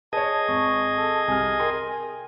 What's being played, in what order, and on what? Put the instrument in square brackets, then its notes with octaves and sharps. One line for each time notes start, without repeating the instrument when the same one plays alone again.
[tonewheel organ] G#4 D#5 [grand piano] B4 C#5 [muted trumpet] A5
[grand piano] G#1 A5 [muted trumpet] C#6
[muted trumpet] A4
[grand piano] C2 F6 [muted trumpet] G#5
[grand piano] A#4 G5 C6